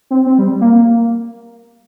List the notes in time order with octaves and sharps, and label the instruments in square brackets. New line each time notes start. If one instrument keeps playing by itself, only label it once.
[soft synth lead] C4
C4
G3
A#3